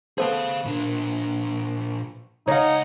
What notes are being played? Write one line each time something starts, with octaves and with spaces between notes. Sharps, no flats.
A3 B3 G#4 C5 F5
A#2 D4
C#2 D#4 C#5 F5 F#5